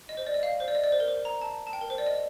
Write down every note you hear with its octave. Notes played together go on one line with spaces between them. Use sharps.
D#5
C5
D5
D#5
F5
C5
D5
D#5
D5
C5
A#4
C5
A#5
A5
A5
G5
A#4
C5
D5
D#5